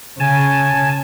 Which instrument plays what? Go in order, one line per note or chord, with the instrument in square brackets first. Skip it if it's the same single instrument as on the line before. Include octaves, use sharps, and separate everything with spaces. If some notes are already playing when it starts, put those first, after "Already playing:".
[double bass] C#3 [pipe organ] G#5 A5